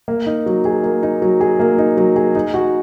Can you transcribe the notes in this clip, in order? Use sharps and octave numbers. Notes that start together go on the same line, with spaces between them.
A#3
D#4
F#3
G#4
A#3
D#4
F#3
G#4
A#3
D#4
F#3
G#4
D#4
F#4